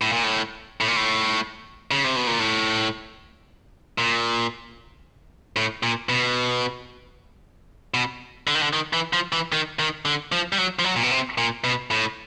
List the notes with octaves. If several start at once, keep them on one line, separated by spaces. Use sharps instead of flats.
A2
A#2
A2
A2
A#2
A2
C#3
C3
B2
A#2
A2
A#2
A2
A#2
B2
B2
D3
D#3
D3
D#3
E3
F3
E3
D#3
D#3
D3
F3
G3
F#3
F3
F#3
A#2
B2
C3
A#2
B2
A2